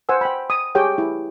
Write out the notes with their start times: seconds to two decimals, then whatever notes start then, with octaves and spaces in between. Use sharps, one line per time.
0.09 C5 F#5 G#5 E6
0.21 G5 B5
0.50 D#6
0.75 G4 G#4 C#5 G5
0.98 E4